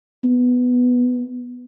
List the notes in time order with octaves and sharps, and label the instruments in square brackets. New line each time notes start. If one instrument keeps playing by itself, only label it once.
[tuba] B3